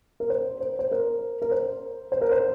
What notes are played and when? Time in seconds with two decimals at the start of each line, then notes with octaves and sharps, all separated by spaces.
0.20 A#4
0.30 C5
0.60 C5
0.79 C5
0.91 A#4
1.42 A#4
1.51 C5
2.12 C5
2.21 A#4
2.31 C5